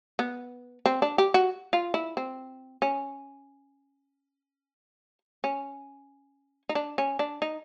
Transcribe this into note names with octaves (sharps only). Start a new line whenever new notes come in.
B3
C4
D4
G4
F#4
F4
E4
C4
C#4
C#4
D#4
D4
C#4
D4
D#4